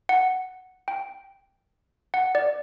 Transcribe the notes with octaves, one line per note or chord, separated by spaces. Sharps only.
F#5
G5
F#5
D5